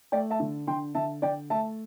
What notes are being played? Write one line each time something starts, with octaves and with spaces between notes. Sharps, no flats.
A3 D5 G5
E5 A5
D3
D3 G5 C6
D3 E5 A5
D3 D5 G5
A3 E5 A5